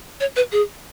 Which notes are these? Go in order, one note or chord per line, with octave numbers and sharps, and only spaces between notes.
C#5
B4
G#4